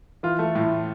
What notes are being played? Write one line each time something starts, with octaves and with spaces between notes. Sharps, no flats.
E3 F4
A3
A2